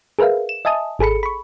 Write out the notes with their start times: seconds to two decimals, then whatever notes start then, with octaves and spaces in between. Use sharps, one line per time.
0.19 G#4 A#4 B4 E5 F5
0.49 E7
0.65 D#5 E5 G#5 A5 D#6
0.99 G#1 G#4 A4 B5 C#7
1.23 B5 C#6